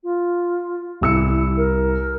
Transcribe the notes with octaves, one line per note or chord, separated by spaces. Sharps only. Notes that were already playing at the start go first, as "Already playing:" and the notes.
F4
C2 E4 E6 C#7
A#4